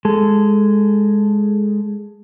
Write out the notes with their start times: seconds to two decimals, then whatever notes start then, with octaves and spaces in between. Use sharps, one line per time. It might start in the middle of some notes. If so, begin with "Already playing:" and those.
0.05 G#3 A4